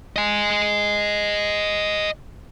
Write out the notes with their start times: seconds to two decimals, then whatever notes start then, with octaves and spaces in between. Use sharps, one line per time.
0.16 D#5 G#5